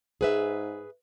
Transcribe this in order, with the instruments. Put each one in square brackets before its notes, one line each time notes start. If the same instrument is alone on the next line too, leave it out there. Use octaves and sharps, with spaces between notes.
[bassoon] G#2 [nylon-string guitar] G#4 B4 E5